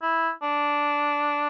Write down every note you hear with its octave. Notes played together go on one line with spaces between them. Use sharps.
E4
D4